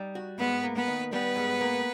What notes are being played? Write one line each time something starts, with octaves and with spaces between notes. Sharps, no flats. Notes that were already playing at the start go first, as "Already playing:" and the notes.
Already playing: G3 D#4
F#4
G#2 B3 B4
A#3
B3 B4
D#3
G3 B3 B4
G#2
A#3